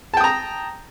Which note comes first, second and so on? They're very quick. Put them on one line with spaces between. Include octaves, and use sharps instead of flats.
A5 G5 D#6 A#5